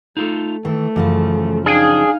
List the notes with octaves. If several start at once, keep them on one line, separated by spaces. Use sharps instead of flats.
A3 D#4 F4 A4
D#3 E3 A3
F#2 C#3 E3 F3
D4 D#4 G#4 F5 G5